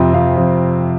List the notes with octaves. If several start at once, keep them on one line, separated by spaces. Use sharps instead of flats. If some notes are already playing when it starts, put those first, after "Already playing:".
Already playing: F2 C3 C4
F2 F5
F2